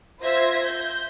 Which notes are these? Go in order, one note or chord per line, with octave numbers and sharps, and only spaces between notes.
F4 C5 E5 G#6 A#6
G6